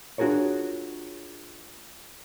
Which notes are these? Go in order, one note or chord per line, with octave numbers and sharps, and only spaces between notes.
D4 F4 F#4 G#4 A#4 C#5